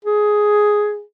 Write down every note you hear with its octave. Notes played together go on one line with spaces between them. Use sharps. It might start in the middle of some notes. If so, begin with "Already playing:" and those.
G#4